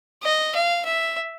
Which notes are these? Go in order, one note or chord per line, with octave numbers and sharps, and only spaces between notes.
D#5
F5
E5